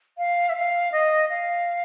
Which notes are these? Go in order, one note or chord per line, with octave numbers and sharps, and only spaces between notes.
F5
E5
F5
D#5
F5